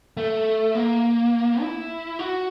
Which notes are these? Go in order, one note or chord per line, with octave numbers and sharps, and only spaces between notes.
A3
A#3
E4
F#4